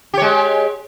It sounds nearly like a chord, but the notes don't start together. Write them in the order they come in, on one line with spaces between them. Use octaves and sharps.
G4 C#5 G#3